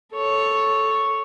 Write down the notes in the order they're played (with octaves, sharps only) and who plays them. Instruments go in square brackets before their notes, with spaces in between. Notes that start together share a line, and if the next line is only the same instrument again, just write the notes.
[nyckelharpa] A4 C#5